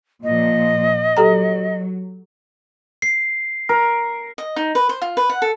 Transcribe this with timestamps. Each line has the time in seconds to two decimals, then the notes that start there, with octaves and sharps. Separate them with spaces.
0.23 A#2 F3 D#5
1.17 F#3 G4 A4 A#5
3.02 C7
3.69 A#4
4.38 D#5
4.56 D#4
4.75 B4
4.89 C5
5.02 F4
5.17 B4
5.30 F#5
5.42 A4